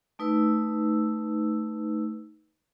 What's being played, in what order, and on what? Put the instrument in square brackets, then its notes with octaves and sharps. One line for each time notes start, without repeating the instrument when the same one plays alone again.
[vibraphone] A3 D#4 B4 E6